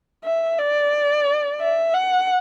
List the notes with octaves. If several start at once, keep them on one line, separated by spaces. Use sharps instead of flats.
E5
D5
E5
F#5